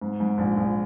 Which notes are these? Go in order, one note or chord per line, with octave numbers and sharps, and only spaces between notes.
G#2
G#2
A#1
A#1